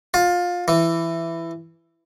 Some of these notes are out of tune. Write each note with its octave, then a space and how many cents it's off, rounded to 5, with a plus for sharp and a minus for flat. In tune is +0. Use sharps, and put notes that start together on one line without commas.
F4 +20
E3 +10